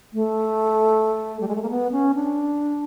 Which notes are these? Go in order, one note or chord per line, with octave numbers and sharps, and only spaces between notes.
A3
G3
G#3
A3
A#3
B3
C#4
D4